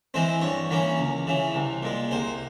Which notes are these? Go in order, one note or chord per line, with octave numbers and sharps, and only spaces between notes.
E3 G#3 C4 C5
G2 C#5
E3 A#3 C#4
C#2
C#3 E3
C2
A#2 G#3
C2 C5